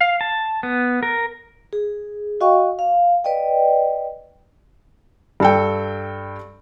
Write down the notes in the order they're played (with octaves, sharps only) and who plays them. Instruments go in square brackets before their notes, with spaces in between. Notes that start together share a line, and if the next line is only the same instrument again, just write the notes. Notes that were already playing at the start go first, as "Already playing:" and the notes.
[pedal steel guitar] F5
A5
B3
A#4
[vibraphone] G#4
F#4 D#5 F5 G5 C#6
F5
B4 D5 D#5 G5
[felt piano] G2 A4 G5